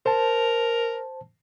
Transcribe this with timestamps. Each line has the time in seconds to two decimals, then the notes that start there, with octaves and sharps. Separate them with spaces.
0.06 A#4 C5 A5